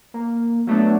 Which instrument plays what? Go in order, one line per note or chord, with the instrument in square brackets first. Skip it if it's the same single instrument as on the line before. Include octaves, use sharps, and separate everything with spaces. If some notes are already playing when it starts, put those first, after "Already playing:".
[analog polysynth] A#3
F#3 A3 B3 D4